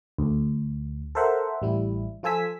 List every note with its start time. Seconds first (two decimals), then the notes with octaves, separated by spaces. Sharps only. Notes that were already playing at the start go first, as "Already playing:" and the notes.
0.18 D2
1.15 A4 A#4 C5 E5 F#5
1.62 A1 G3 E4
2.23 F3 F4 A4 G#5 E6 B6